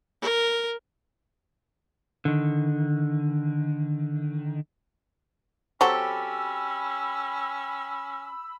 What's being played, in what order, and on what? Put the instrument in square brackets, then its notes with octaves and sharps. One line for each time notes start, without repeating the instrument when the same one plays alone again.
[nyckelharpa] A#4
[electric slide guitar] D3 D#3
[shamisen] F#3 C4 F#4 [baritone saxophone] C#4 [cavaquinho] G4 A4 [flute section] B5 E6